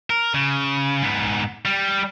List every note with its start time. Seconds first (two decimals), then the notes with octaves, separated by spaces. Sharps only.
0.10 A#4
0.34 C#3
1.02 G#2 B3
1.65 G3